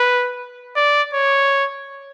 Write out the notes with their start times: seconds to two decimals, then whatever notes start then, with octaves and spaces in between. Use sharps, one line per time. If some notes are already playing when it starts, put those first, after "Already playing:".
Already playing: B4
0.76 D5
1.14 C#5